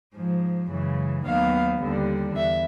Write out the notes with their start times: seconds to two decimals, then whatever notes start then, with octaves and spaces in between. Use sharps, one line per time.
0.16 G#2 F3 G#3
0.71 F#2 C#3 E3 G#3
1.26 D#2 D#3 F#3 B3 F5
1.81 D#2 D3 G3
2.36 E2 E5